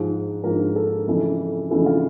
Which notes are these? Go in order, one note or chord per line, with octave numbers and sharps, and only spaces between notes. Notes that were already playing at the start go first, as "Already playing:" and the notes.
Already playing: G#2 F3 G#3
G#2 F3 G#3 A#4
A4
F2 C#3 E3 A3
F2 C#3 E3 A3
F4